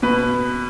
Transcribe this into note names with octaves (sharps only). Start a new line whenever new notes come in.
B2 B4